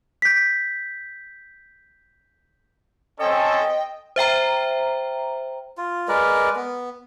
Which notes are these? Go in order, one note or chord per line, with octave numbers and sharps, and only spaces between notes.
G6 B6
C4 C#4 A4 D#5 G5
C5 E5 G5 A#5
F4
G#3 A#4 B4 D5
B3